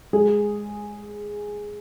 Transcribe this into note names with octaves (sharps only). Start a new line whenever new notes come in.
G#3 G#4